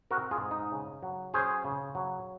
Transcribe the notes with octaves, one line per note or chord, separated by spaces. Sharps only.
C4 F#4 A#4
F4 G#4
G#2
D#4
C#3
F#3
C#4 G#4 C5
C#3
F#3